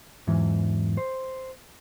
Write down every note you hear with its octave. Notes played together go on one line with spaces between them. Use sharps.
E2 G#2 E3
C5